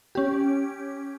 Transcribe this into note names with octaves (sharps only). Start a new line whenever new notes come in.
C#4 G4